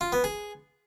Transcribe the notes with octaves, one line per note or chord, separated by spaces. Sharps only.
F4
B3
G#4